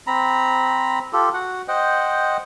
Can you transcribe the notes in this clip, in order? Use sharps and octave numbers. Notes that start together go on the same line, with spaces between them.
C4 A#5 B5
F4 G4 A4
F#4 F#5
C5 D#5 F#5 G5